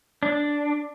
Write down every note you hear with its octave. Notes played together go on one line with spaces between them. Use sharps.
D4